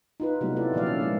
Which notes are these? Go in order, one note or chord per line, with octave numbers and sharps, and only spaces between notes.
D#4 F4 B4
C3 F#3 G3 A3 B3
A3 E4 F4 A4 D5
A#2 D#3 F3 F#3 D5 F5
C#4 A4
G#3 A3 F4